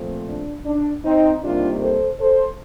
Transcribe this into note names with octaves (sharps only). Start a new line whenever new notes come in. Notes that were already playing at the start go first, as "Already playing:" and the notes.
Already playing: A#2 F3 A3 C4
D4
D4
C4 D#4
C3 D#3 G3 A#3 D4 F4
A4 C5
A4 C5